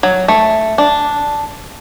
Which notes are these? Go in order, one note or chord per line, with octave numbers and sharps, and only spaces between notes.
F#3
A3
D4